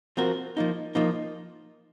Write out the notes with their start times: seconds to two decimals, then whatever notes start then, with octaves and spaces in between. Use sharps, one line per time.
0.17 F3 C4 F#4 A#4
0.57 F3 A#3 D#4
0.95 F3 A#3 D#4